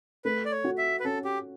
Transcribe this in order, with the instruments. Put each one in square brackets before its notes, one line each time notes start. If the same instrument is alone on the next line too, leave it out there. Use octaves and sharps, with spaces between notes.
[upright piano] A3 [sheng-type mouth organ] B4
[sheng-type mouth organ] D5
C#5
[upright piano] F#4
[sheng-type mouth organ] E5
B4
[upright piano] C#4 [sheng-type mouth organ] A4
[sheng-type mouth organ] G4